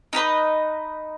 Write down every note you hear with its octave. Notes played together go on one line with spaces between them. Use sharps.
D#4 G4 B4 D#5